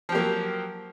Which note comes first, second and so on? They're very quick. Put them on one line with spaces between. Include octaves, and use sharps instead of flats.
F3 G4 A#3 F#3